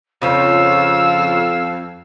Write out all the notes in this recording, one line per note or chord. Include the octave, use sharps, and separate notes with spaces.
F2 C#3 F3 C#4 F5 E6